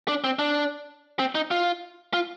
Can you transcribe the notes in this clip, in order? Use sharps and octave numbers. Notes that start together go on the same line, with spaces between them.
D4
C4
D4
C4
D#4
F4
F4